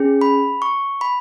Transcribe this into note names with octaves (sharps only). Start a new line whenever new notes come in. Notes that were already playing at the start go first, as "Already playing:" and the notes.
Already playing: C#4 G#4
B5
C#6
B5